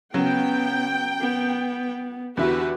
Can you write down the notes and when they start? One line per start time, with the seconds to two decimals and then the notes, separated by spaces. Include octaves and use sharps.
0.14 C#3 F#3 B3 G5
1.21 B3
2.37 E2 D3 F#4 G4 B4 E5